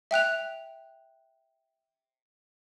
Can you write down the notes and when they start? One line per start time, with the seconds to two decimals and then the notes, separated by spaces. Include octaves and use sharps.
0.11 E5 G5 F#6 F7